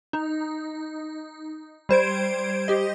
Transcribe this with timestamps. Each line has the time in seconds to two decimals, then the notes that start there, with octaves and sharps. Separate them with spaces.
0.13 D#4
1.89 G3 C5 G#6 D7
2.68 G4 D#5